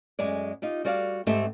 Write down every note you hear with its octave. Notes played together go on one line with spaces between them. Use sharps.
F#2 G#3 G#4 D5
D#4 F4 G4
G3 F#4 D5 F5
G#2 A3 C4 G4 E5